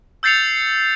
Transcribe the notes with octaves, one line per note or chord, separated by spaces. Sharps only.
E6 G6 A6 C7 C#7 F7